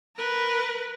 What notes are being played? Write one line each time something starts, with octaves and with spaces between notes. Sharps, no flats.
A#4 B4